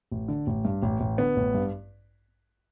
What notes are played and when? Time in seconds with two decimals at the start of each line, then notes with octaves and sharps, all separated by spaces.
0.12 A1
0.28 D3
0.47 A1
0.65 G2
0.83 A1
1.00 A1
1.18 D3 B3
1.36 A1
1.55 G2